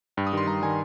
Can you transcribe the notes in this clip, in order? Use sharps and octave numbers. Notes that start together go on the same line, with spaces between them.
G2 G5
D#6
D#3 G3 C6
G2 A#5
D#3 G3 G#5